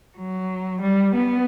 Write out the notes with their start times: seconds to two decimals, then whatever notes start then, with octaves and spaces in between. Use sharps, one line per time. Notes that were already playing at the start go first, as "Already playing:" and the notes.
0.17 F#3
0.82 G3
1.15 B3